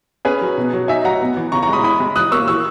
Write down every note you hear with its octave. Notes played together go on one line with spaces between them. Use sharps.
C#4 G#4 B4
F#3
B2
F#3
D#4 E5 G#5
F#3 F#5 A#5
B3
E3
C#3 A#5 C#6
A#5 C#6
G#3 B5 D#6
E4 B5 D#6
G#3
E3 D#6 F#6
A#3 C#6 E6
E3 C#6 E6